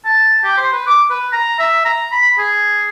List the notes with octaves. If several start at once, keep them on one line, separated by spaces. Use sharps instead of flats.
A5
G4
C5
B4
D6
B4
A#5
E5
A#5
B5
G#4